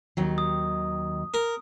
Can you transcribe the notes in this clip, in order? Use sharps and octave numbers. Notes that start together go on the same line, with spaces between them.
D#2 D#3 F#3
D#6
A#4